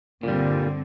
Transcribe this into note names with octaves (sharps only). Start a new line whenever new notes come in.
G2 A#2 D3 G3 C4